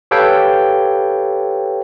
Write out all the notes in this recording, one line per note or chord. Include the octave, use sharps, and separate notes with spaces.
G4 A4 B4 C#5 F5 G5